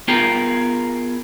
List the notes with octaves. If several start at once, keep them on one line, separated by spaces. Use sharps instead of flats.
B3 F4 G#4 A#4 G5